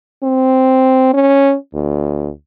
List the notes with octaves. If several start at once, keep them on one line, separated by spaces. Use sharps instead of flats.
C4
C#4
D2